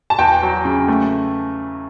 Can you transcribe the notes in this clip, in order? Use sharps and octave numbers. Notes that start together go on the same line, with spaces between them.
A5
E2 G5
F#3
C#3
A3